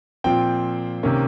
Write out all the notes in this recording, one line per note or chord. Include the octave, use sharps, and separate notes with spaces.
A#2 F3 C4 G5
C3 D#3 A#3 C#4